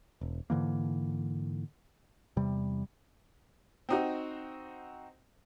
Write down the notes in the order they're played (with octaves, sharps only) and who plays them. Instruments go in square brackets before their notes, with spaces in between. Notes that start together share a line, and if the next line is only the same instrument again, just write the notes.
[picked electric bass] E1
G#2 D3 E3 A#3
E2 C3 G3
[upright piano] C4 D#4 F#4